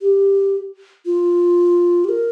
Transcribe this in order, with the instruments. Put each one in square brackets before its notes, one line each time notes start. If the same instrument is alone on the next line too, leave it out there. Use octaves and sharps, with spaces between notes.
[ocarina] G4
F4
G4
A#4